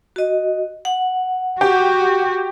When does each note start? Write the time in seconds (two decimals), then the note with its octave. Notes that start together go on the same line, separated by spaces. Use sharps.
0.16 F#4 D#5
0.85 F#5
1.61 F#4 G4